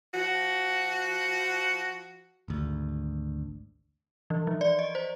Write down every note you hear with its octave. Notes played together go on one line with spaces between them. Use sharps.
F3 F#4
G#1 D2
E3
F3
D5
D#5
C5